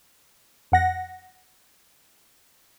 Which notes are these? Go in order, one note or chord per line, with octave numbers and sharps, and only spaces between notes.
F2 F#5 A#6